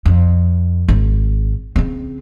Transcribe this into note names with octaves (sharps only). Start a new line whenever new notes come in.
F2
G#1
C#3 C4